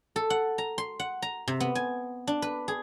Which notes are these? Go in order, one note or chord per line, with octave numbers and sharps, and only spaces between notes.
A4
F#5
A#5
C6
F#5
A#5
C3
B3
G#5
D4
B4
G#4